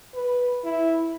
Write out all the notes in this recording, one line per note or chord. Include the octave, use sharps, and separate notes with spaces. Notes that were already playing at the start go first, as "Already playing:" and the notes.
B4
E4